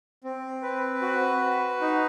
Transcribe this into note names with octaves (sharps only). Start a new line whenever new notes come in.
C4
B4
F#4
B4
D#4